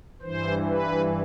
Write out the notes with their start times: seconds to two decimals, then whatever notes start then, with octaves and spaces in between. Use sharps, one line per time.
0.22 G2 E3 C5
0.69 B4